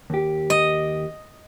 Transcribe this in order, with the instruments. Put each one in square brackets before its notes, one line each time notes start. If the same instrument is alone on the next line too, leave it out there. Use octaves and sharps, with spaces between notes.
[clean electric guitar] D#2 G4
[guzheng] D#5